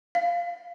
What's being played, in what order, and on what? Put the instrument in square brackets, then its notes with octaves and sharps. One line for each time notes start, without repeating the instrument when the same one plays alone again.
[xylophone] F5